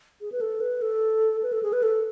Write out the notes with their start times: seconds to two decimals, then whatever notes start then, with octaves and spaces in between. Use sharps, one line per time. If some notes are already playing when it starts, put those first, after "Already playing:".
0.21 G#4
0.32 B4
0.41 A4
0.61 B4
0.82 A4
1.43 B4
1.53 A4
1.63 G#4
1.73 B4
1.83 A4